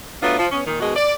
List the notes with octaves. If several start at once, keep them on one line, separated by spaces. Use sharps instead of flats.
F#3 A3 B3 D4 F4
F3
B3 C#4
A#2 D#3
B2 D#3 G#3 F#4 G#4
D5